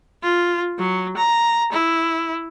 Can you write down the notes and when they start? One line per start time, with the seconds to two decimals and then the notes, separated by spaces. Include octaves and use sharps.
0.23 F4
0.78 F#3
1.16 A#5
1.72 E4